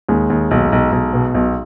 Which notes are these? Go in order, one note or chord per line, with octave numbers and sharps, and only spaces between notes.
D#2 G#3
D#2
B1
B1
B1
B2
B1